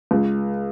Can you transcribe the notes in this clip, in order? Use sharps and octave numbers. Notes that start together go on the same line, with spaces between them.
C#2